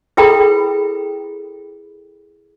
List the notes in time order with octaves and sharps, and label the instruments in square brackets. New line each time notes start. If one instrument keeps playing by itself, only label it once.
[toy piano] E4 G#4 A4 B4 G5 B5